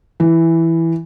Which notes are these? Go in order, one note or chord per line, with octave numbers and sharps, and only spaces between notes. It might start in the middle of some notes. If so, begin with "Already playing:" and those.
E3